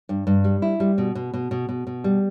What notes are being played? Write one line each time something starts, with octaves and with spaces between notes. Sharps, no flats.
G2
G2
G3
E4
G3
B2
B2
B2
B2
B2
B2
G3